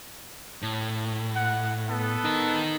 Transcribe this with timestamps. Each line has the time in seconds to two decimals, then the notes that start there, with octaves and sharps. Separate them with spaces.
0.62 A2
1.35 F#5
1.89 B3 A4
2.25 D#4 A#4